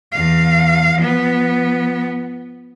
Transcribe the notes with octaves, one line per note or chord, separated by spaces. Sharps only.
E2 F5
F3 B3